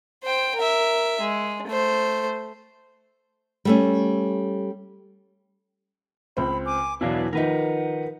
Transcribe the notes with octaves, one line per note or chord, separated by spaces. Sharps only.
C5 G5
A#4 E5
G#3
A3 C5
G3 A3 C#4
C#2 C4 B5
G#5 D6
E2 B2 F#3 D4 E4 B4 D5 F5
D#3 F3 D#4 A#4 B4 F#5